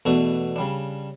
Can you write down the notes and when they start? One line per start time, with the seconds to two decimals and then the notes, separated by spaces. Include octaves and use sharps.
0.05 E2 B2 A3 D4 F#4
0.56 C#3 G3 D4